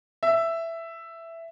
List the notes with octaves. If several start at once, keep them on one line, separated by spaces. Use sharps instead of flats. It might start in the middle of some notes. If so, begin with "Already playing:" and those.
E5